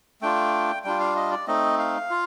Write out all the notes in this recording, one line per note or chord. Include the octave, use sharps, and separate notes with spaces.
A3 D4 F4 G5
G3 D4 F4 G5
F5
D#5
D5
A3 C4 D#4 D#5
F5
F4